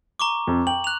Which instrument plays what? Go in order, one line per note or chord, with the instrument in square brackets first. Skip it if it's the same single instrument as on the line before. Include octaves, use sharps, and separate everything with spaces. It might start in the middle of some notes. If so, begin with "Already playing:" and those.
[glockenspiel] A#5 C#6 D6
[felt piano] F2
[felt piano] G5 [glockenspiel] F#7
[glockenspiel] F#6 F7